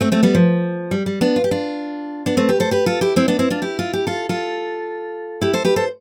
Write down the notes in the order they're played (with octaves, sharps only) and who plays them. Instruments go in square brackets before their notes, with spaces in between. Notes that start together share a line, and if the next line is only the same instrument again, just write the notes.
[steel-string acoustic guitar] A3 C4
A3 C4
G3 B3
F3
G3
G3
B3 D4
F4
G4
D4 F4
B3 D4
A3 C4
G4 B4
A4 C5
G4 B4
F4 A4
E4 G4
C4 E4
B3 D4
C4 E4
D4 F4
E4 G4
F4
G4
F4 A4
F4 A4
E4 G4
A4 C5
G4 B4
A4 C5